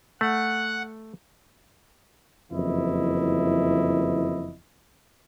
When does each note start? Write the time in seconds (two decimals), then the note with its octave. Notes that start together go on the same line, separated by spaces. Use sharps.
0.21 A3 F#5
2.52 F#1 F2 E3 E4 D#5